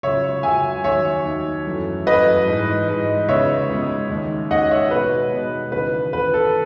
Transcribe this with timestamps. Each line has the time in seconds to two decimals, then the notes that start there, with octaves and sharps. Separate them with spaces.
0.03 C#2 C#3 F#3 C#5 E5
0.43 C#2 C#3 F#3 E5 G#5
0.84 D#2 D#3 F#3 C#5 E5
1.25 D#2 D#3 F#3
1.65 F#2 E3 A3
2.06 F#2 E3 A3 B4 D#5
2.47 G#2 E3 G#3
2.88 G#2 E3 G#3
3.28 C#2 C#3 G#3 B3 D#4 C#5 E5
3.69 C#2 C#3 G#3 B3 D#4
4.10 D#2 D#3 G#3 C#4
4.50 D#2 D#3 G#3 C#4 D#5 F#5
4.71 C#5 E5
4.91 B2 G#3 B3 D#4 B4
5.32 B2 G#3 B3 D#4
5.72 D#2 C#3 E3 B4
6.13 D#2 C#3 E3 B4
6.34 A4